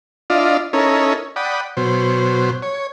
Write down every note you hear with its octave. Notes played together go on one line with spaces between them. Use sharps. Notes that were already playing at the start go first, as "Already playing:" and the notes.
D4 E4 F4 D5 D#5 F5
C#4 D#4 E4 A4 A#4 C#5
D5 F#5 G5 B5 D#6
B2 F#3 C5
C#5